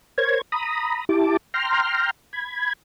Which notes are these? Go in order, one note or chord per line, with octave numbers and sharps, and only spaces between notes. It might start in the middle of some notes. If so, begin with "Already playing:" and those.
A#4 C5 C#5 G#6
A#5 B5 D#6
E4 G4 A5 D6
G5 A#5 C6 F6
B5 G#6